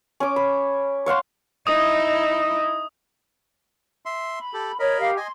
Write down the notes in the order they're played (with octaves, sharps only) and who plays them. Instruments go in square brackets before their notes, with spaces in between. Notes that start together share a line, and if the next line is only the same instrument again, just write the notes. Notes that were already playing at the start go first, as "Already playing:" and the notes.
[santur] C#4 D6
B5
C#5 F5 F#5 C6
[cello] D#4 E4 [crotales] D#6
[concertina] E5 C6
[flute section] B5
[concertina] G4 A4
[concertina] A#4 D#5 B5 [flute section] C#5
[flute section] G4 F5
[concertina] D#5 G#5 [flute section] C6